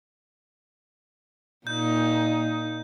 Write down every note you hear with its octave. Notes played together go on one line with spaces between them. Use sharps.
A#2 D#4 G6